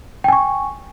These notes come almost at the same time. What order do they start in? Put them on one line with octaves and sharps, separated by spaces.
G5 G#5 C#6